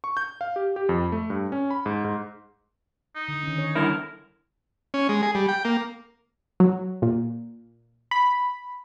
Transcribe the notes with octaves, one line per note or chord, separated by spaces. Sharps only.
C#6
G6
F5
G4
G4
F2
A3
G2
C#4
B5
G#2
G#2
D#4
D3
D#3 C#4
C#5
G2 D3 E4 A#4
C#4
G#3
G#4
G3
G5
A#3
F#3
A#2
B5